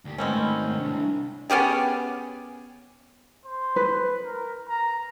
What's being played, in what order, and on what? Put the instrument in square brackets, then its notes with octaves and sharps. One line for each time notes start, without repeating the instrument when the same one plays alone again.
[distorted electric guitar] D2 G4
[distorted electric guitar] G#2 D#3 [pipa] B2 C4 C#4 [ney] A3
[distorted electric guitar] C2 [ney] D4
[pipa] B3 C#4 G4 G#4
[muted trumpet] C5
[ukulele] B4
[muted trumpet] A#4
A#5